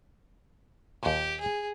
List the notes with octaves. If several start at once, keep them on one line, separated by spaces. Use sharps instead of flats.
D#2 A#2 G4
G#4